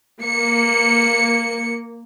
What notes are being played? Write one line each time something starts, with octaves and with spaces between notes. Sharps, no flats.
A#3 C#7